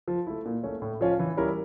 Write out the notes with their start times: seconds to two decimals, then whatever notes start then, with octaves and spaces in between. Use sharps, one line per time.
0.08 F3
0.27 A3 E4
0.45 A#2
0.63 A3 C#4
0.82 A2
1.01 F3 C#4 F4
1.19 E3
1.37 G3 C#4 E4 A#4